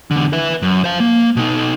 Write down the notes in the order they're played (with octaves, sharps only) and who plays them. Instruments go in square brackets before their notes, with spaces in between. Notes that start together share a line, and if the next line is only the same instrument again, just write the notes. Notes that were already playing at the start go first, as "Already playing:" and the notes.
[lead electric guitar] E2 D3
B4 E5
F#2
C5 F5
A#3
B2 D#4